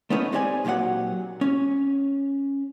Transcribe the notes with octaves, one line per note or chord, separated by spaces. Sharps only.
A3 B3 C#4 D#4
C4 D#4 G4 D5 F5 G#5
A#2 F#3 G4 C#5 F#5
C#4